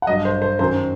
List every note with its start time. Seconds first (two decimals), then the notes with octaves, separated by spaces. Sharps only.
0.02 F#5
0.07 G2 F#3 D#5
0.25 C5
0.42 C5
0.59 F#2 D#3 F#3 C5